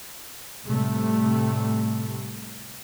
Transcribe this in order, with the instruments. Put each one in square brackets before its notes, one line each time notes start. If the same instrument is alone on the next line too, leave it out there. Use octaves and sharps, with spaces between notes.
[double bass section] A2 C3 G3 A3